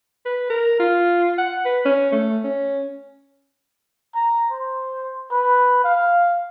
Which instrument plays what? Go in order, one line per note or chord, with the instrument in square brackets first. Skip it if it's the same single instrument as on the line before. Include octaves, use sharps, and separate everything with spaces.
[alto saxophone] B4
A#4
F4
F#5
B4
C#4
A3
C#4
[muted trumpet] A#5
C5
B4
F5